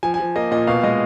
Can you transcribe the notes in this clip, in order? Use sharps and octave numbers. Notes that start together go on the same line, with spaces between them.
F3 G#5
G#5
F3
A#3 D#5
A#2 D#5
B2 F5
G#3 D#5